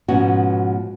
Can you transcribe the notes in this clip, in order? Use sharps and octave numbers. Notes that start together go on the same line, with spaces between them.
G#2 B2 F3 B3 C#4 F#4